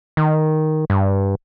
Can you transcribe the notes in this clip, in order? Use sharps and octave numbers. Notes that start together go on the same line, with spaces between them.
D#3
G2